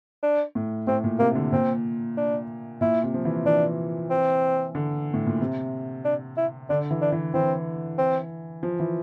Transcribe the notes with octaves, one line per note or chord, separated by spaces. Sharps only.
D4
A2
A2 C4
A#2
C3 A#3
D3
A#2 C4
D4
A#2 E4
C3
F3
E3
E3 D4
C4
D3
A2
A#2
C3
D4
E4
D3 D4
E3
D4
E3
E3 C4
C4
F3
E3